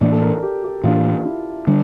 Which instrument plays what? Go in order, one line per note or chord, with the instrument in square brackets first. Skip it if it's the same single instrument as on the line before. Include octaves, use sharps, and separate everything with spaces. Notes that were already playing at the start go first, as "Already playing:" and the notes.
[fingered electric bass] A2 E3 A#3 D4 [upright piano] D5
[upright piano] A4
A#4
G4
G4
[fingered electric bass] A2 E3 A#3 D4 [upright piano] F4
[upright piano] E4
[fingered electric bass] D3 G3 [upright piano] D4